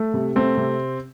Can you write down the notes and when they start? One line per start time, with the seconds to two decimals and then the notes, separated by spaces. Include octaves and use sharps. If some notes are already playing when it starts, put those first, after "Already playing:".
Already playing: A3
0.14 C3
0.36 A3 C4
0.57 C3